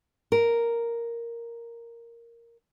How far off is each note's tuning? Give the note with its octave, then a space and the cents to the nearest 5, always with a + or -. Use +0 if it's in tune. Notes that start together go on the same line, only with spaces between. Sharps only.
A#4 +0